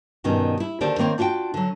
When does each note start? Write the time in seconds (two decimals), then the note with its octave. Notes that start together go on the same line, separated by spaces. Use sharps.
0.24 G2 B2 D#3 C#4
0.60 E4
0.81 D#2 D3 A#4 C5 D5
0.98 D#3 A#3 C4 C#5
1.18 D4 F4 F#4 E5 G5
1.54 D3 F#3